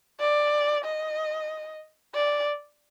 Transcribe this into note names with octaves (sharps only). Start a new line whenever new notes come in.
D5
D#5
D5